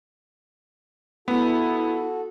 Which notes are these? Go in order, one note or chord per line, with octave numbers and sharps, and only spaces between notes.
B3 E4 F#4 A4